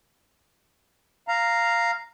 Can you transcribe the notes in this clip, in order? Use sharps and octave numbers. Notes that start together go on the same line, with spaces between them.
F5 A#5